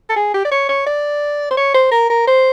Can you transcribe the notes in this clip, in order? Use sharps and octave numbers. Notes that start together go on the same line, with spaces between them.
A4
G#4
G4
D5
C#5
C#5
D5
C5
C#5
C5
A#4
A#4
C5